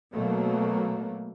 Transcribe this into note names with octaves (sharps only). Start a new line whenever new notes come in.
B2 F#3 A3 A#3